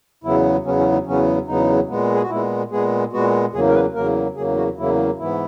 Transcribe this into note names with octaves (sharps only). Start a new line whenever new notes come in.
E2 C#3 F#3 B3 E4
E2 C#3 F#3 B3 C#4
C#4
D#4
E2 C#3 F#3 B3 C#4
E2 C#3 F#3 B3 D#4
A#2 G#3 B3
G#4
F#4
A#2 G#3 B3 E4
A#2 G#3 B3 G#4
A#2 G#3 B3 F#4
E2 C#3 F#3 A#3 G#4
A#4
B4
E2 C#3 F#3 A#3 A#4
E2 C#3 F#3 A#3 G#4
F#4
E2 C#3 F#3 A#3 E4
G#2 E3 B3 E4